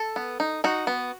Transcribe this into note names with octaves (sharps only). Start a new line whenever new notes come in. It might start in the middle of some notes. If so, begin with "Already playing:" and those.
Already playing: A4
B3
D#4
D#4 F#4
B3